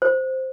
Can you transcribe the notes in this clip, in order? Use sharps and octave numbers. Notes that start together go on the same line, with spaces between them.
C5